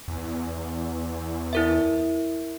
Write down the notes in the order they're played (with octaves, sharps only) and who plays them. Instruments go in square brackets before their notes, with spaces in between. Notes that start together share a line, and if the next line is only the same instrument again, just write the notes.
[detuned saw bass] E2
[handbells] E4 A#4 E5